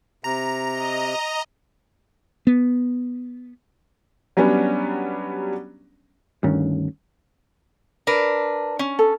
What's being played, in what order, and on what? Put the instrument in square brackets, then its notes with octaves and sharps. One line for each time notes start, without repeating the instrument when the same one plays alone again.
[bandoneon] C3 [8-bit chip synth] A#5
[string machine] D#5
[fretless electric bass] B3
[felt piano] F#3 G3 B3 C#4 D4
[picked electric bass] D2 G2 D#3 C#4
[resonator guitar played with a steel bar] D4 A#4 B4
C#4
[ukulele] A4